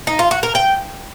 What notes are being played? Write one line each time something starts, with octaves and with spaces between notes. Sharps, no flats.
D#4
F4
F#4
A#4
G5